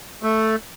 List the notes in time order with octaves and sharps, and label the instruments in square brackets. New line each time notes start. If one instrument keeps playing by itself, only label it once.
[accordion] A3